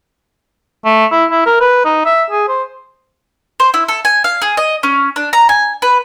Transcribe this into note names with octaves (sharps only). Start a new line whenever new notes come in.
A3
E4
E4
A#4
B4
D#4
E5
G#4
C5
C5
E4
A4
G#5
F5
G#4
D#5
C#4
D4
A#5
G#5
B4